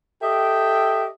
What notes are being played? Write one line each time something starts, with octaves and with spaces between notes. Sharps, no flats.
G4 A4 D#5 E5 G5